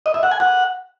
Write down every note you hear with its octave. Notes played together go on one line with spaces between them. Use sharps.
D#5
E5
F#5
G#5
F#5